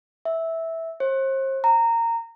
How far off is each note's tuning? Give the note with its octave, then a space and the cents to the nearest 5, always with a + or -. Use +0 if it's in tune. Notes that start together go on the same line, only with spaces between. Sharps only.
E5 -10
C5 +40
A#5 -15